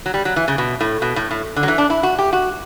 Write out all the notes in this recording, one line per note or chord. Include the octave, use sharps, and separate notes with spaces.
F#3
G3
F#3
E3
C#3
B2
A2
B2
A2
A2
D3
F#3
E3
D4
E4
F#4
G4
F#4